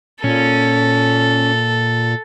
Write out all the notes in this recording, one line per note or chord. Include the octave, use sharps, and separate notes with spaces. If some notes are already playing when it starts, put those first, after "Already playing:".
A#2 C#4 A4